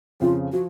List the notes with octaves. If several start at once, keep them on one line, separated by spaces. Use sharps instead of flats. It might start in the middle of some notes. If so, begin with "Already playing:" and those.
F2 C#3 F3 F4
F3 F#4